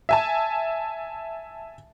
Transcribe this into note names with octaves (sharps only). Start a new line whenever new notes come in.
E5 G#5 A5